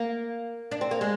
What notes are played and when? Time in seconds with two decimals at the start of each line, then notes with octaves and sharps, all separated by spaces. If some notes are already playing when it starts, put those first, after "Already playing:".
Already playing: A#3
0.71 D4
0.81 C4
0.91 A#3
1.01 G#3